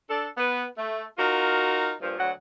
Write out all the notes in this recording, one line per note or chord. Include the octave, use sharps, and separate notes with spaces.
D4 A4
B3 B4
A3
D#4 F4 F#4 A#4
G2 A#2 F3
D2 F#3 F#5